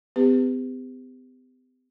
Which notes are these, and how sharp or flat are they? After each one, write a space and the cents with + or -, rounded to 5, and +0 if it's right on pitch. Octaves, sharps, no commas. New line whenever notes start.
B3 +45 G4 +30 B4 +25